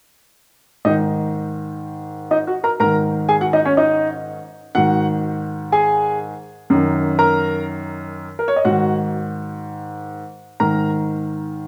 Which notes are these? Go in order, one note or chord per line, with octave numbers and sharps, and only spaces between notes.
G#2 D#3 D#4 D#5
D#4 D#5
F#4 F#5
A#4 A#5
G#2 D#3 A#4 A#5
G#4 G#5
F#4 F#5
D#4 D#5
C#4 C#5
D#4 D#5
G#2 D#3 F#4 F#5
G#4 G#5
F#2 D#3
A#4 A#5
A#4
C#5
D#5
G#2 D#3 F#4 F#5
G#2 D#3 A#4 A#5